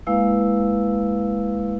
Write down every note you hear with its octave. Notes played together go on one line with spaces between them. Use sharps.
G#3 A#3 E4 B4 F5 E6